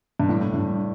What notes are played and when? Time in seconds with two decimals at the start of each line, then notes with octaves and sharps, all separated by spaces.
0.20 G2
0.29 A2
0.54 G2